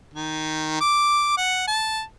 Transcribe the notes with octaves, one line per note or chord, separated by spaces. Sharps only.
D#3
D6
F#5
A5